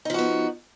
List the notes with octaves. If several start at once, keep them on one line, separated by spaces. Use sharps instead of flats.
F3 B3 D#4 F#4